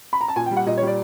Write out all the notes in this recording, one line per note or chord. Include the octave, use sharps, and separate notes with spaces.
B5
A#5
A5
A#2 G#5
G5
G3
F#5
A#2 D#5
C#5
G3
D5